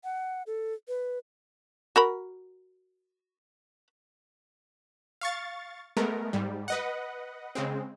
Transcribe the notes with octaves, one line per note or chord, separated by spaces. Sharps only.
F#5
A4
B4
F#4 A#4 B5
F5 C#6 A6
G#3 A3 B3 A#4
G#2 G3
B4 D#5 F#5
C#3 G#3 C4